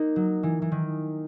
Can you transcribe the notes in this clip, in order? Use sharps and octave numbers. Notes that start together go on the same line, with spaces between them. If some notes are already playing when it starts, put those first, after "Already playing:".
Already playing: A#3 D#4
F#3
E3
E3
D#3